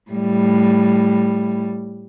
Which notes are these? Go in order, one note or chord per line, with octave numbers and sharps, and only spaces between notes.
A2 G3